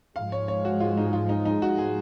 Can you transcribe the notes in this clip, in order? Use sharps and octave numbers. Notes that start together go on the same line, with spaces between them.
G#2 F3 G#3 F5
C#5
C#5
F#4
F4
D#4
F4
D#4
D#4
F#4
G#4